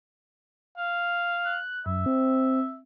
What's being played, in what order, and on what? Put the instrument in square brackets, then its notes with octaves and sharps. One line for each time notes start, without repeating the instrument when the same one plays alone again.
[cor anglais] F5
[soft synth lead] F#6
[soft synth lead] F#2 [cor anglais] E5
[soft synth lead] C4